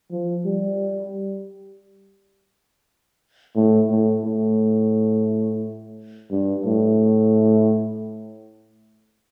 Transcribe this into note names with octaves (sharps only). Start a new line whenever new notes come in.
F3
G3
A2
A2
A2
G2
A2